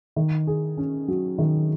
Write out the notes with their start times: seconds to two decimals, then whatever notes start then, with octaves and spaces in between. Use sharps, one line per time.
0.16 D#3
0.47 G#4
0.77 C#4
1.08 F#3
1.38 D#3